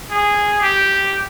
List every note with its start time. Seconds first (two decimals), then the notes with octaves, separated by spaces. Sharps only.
0.11 G#4
0.62 G4